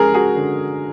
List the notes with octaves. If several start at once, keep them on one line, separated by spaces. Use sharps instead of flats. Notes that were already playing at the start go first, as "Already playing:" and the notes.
Already playing: G#3 C#4 G#4 A#4
F#4 G#4
D3